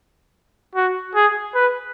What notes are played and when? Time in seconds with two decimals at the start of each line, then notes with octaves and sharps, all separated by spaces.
0.75 F#4
1.15 G#4
1.55 B4